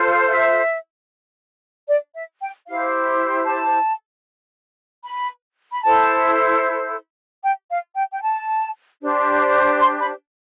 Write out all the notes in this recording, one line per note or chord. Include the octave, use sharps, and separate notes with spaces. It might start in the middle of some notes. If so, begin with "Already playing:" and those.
Already playing: F4 A4 C5
F5
E5
D5
E5
G5
E4 G4 C5 F5
A5
B5
B5
E4 A4 C5 A5
G5
F5
G5
G5
A5
D4 G4 C5
C6
B5